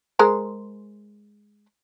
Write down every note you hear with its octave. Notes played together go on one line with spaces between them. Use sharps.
G#3 A#4 C5